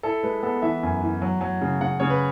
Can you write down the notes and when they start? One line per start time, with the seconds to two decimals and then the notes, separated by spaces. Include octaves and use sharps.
0.03 E4 A4
0.23 G#3 B4
0.43 B3 A4
0.62 E3 E5
0.83 F#2
1.02 E3
1.22 F#3
1.41 F#3
1.61 C#3
1.80 C#3 F#5
2.00 C#3 C#5
2.10 B4